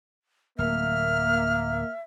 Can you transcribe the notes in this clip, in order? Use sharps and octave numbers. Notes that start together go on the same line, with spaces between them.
D1 A#3 E5 F6